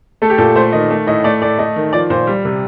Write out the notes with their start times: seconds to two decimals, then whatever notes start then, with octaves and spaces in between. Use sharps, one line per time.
0.22 A3 A4
0.30 G4
0.38 A#2 A4
0.56 A3 C5
0.73 D#3 D#5
0.91 A3
1.07 A2 D#5
1.24 A3 D5
1.42 A2 D5
1.59 A3 D#5
1.76 D#3
1.93 F3 D5
2.10 A#2 C5
2.27 G3
2.45 C3